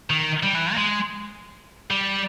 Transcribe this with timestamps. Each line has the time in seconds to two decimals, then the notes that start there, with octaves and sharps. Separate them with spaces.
0.10 D#3
0.43 G3
0.55 E3
0.73 A#3
0.77 G#3
1.90 G3